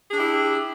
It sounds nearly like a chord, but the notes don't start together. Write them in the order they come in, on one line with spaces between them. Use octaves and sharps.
G#4 D4 G4 E4